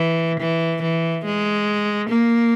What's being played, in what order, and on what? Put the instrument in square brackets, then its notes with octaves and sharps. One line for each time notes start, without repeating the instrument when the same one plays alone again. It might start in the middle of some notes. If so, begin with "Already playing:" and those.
Already playing: [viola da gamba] E3
E3
E3
G#3
A#3